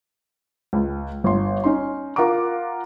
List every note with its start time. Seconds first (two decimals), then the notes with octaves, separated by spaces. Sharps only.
0.73 C#2
1.24 G1 C6
1.64 C#4 D#4 C6
2.16 F4 A#4 F#5 A#5 D6